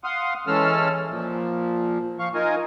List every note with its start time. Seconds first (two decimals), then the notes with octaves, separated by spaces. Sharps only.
0.04 F5 F#5 C6 D#6
0.47 E3 G#3 C#4 A4 E6 F6
1.10 A#2 F3
2.19 F3 F5 C#6
2.35 D#4 F4 A#4 D#5 G#5